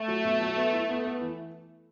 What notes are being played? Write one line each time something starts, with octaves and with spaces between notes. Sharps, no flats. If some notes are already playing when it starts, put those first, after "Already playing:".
Already playing: A3
F#3
B2
F#3
B3
E4
B3
B3
E3